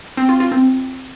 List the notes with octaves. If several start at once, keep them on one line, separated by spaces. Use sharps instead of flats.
C4
F4
F4
C4